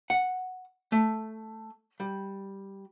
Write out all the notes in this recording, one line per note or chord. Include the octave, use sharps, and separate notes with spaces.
F#5
A3
G3